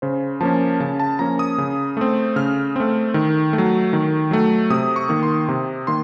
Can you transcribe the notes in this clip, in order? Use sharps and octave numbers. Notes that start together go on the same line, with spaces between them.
C#3 C5
F3 A#3 C#4 A5
C#3 A5
A5
F3 A#3 C#4 A#5
D#6
C#3
A3 C4
C#3 F6
A3 C4
D#3
A3
F#3
D#3
F#3 A3
C3 D#6
C#6
D#3 A#3
C6
C3
D#3 A#3 C6